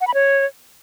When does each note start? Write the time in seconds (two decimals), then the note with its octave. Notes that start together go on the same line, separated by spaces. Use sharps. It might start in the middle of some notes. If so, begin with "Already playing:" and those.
0.01 F#5
0.07 B5
0.14 C#5